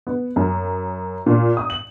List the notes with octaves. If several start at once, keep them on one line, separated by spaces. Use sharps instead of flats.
B3
F#2
A#2
D#6
F#7